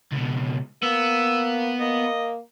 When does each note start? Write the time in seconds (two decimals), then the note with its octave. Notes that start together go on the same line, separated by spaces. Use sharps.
0.12 C#2 B2
0.83 A#3 B3 E6
1.80 A#3 D#5